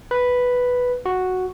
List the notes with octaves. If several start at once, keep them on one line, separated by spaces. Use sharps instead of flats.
B4
F#4